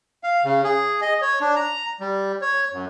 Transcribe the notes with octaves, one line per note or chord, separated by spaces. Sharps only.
F5
C#3
G#4
D#5
C#5
D4
A#5
G3
C#5
F#2